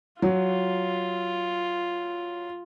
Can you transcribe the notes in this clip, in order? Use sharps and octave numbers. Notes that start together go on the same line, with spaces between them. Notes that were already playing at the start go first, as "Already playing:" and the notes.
F#3 F4